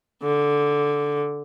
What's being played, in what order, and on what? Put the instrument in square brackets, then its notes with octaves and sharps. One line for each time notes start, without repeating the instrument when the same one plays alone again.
[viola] D3